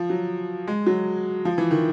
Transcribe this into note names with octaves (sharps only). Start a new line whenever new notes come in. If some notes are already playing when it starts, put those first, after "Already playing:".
Already playing: F3
F#3
G#3
F#3
F3
E3
D#3